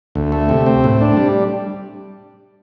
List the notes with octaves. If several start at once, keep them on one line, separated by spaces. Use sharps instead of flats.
D2
A3
C3
C4
A2
D4
G3